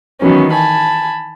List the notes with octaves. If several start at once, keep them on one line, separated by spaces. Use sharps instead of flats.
D#3 E3 F#3 B3 C#4
G#5 A5 B5